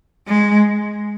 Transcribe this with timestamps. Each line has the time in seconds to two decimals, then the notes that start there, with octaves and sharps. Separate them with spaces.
0.28 G#3